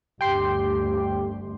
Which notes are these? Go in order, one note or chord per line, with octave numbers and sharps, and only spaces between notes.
G1 D2 G4 G5 C6